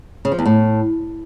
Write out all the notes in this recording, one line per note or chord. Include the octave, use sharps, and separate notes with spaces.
C#3
F3
E2
A2